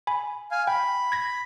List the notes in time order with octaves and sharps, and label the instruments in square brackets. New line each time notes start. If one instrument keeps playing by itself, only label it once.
[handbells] G#5 B5
[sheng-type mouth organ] F5 G#5
[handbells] G5 [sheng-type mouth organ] B5
[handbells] G#6 A#6